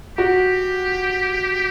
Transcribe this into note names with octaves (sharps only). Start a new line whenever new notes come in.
F#4 G4